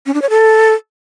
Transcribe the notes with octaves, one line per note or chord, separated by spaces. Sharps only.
C#4
D4
C#5
A4